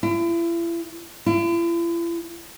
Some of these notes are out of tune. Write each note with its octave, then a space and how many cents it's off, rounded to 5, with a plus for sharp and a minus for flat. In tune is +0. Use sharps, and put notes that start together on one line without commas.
E4 +40
E4 +45